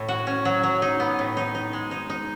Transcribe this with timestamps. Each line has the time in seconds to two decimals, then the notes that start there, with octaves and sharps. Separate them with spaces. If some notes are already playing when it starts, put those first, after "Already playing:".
Already playing: A2
0.08 F#4
0.27 C#4
0.45 F#3
0.63 F#3
0.82 D#4
1.00 B3
1.19 A2
1.37 D#4
1.55 D#4
1.73 G#3
1.91 D#4
2.10 D#4